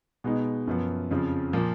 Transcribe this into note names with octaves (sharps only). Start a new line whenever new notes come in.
B2 G#3 B3 D#4
F#2 F3 B3
F2 C#3 F3
A#2 F3 A#3